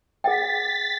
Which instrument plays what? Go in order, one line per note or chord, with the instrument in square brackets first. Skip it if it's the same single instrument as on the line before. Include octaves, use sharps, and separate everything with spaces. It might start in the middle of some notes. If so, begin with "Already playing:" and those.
[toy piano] G#4 F#5 G5 [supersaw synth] A6 B6